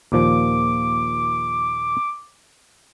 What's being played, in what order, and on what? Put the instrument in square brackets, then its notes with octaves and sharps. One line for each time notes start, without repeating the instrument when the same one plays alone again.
[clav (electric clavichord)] D#2 A#2 F3 [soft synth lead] D6